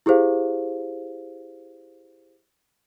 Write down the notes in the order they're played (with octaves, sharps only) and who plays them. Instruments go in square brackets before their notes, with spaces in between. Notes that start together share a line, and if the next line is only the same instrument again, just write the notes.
[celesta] E4 G4 G#4 C5 F5